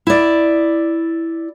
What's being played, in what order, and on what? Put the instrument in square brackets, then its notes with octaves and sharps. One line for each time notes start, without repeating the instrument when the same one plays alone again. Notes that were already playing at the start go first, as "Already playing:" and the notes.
[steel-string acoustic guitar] E4 D5